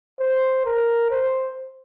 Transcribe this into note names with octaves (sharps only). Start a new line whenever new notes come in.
C5
A#4
C5